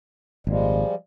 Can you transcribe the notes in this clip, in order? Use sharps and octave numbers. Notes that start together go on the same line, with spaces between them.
G#1 A#2 F3 G3 G#3